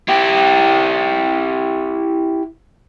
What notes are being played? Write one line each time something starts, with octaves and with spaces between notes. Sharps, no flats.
E4 G4